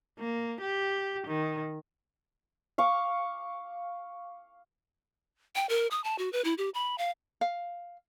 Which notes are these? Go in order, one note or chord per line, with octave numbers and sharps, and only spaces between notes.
A#3
G4
D#3
F5 C#6 D6
G5
A#4
D#6
A5
F#4
B4
E4
G4
B5
F5
F5